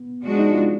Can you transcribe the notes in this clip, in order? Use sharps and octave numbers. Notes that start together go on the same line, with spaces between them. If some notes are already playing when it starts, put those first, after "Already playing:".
Already playing: B3
F3 G#3 D4 F#4
D#4
F4